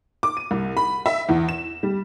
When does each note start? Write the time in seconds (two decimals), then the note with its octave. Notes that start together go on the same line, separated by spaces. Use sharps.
0.23 D6
0.37 D#7
0.51 C2
0.77 B5
1.06 E5
1.29 E2
1.49 E7
1.83 G3